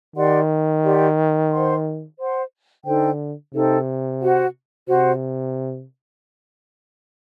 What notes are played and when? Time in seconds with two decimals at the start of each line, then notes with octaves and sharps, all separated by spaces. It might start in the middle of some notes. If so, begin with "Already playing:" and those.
0.16 D#3 G4 D5 F#5 C6
0.84 G4 D5 F#5 C6
1.52 C5 F#5 C6
2.19 C5 F#5 C6
2.86 D3 D#4 A4 C5 G5
3.54 C3 D#4 A4 C5 G5
4.21 F#4 C5 F#5
4.89 C3 F#4 C5 F#5